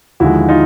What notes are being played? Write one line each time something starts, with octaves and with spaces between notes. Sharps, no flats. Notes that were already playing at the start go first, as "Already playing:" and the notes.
D#2 D3 F3 G#3 E4 F#4
D#4 F4